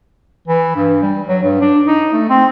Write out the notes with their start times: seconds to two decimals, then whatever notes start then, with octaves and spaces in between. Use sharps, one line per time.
0.48 E3
0.76 G2
1.02 G3
1.28 F#3
1.42 G2
1.61 D4
1.87 D#4
2.13 A3
2.30 C4